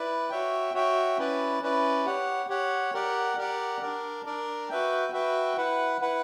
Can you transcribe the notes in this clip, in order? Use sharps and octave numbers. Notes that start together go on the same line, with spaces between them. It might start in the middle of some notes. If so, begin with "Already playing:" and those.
Already playing: E4 B4 D5
F#4 C#5 E5 G5
F#4 C#5 E5 G5
C#4 E4 B4 D5
C#4 E4 B4 D5
G4 C#5 F#5
G4 C#5 F#5
G4 A#4 D5 F#5
G4 A#4 D5 F#5
D4 A#4 D5
D4 A#4 D5
F#4 B4 E5 G5
F#4 B4 E5 G5
E4 B4 F#5
E4 B4 F#5